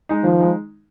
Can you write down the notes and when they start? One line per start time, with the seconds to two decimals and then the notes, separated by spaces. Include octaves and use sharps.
0.09 G#3 D#4
0.24 D#3 F3
0.39 G#3 D#4